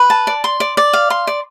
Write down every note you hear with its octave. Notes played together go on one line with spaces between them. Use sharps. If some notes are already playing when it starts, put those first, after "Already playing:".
Already playing: B4
A5
D5
C6
D5
D5
F5
C6
D5